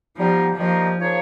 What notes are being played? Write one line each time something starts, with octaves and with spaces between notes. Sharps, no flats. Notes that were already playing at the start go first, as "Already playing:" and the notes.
F3 G3 B3 D#4
D#3 F3 G3 A#3 D#4
F3 A#3 D#4 G#4 C#5